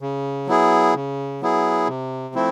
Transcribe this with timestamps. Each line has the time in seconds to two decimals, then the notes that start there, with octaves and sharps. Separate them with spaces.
0.01 C#3
0.47 F#3 B3 E4 G#4
0.94 C#3
1.41 F#3 B3 E4 G#4
1.88 C3
2.34 F3 A3 C4 E4